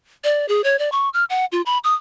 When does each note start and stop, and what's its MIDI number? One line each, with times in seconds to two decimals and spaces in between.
0.24 0.48 74
0.48 0.64 68
0.64 0.79 73
0.79 0.90 74
0.92 1.09 85
1.14 1.24 89
1.30 1.45 78
1.52 1.62 65
1.66 1.78 83
1.84 1.94 87